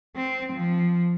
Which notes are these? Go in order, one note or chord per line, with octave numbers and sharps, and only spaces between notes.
C4
F3